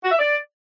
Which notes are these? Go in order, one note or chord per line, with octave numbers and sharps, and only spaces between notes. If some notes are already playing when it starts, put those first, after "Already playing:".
F#4
E5
D5